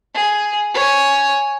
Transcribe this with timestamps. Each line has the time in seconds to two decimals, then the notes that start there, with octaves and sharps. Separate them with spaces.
0.14 G#4
0.74 C#5 G#5